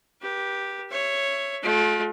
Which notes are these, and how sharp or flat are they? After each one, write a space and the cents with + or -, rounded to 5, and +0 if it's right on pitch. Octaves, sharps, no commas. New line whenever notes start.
G4 +0 B4 -40
C#5 +0 E5 +15
A3 -35 F4 +35